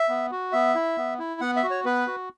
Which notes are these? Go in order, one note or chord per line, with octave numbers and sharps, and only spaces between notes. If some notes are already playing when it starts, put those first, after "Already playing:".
Already playing: E5
B3
F#4
B3 E5
E4
B3
E4
B3 F#5
E5
F#4
C#5
B3 B4
F#4